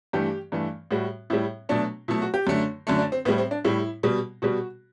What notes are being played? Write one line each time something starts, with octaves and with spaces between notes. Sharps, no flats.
G2 E3 A3 G4
G2 E3 A3
A2 G3 F#4
A2 G3 E4
B2 F#3 A3 D4
B2 F#3 A3 E4
F#4
G4
F#2 D3 A3
F#2 D3 A3
D4
C4
A2 G3 B3
C4
D4
A2 G3 E4
B2 G3
B2 G3 F#4